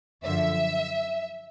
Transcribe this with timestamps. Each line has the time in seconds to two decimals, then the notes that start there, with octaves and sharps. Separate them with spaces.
0.24 F#2 D3 F3 E5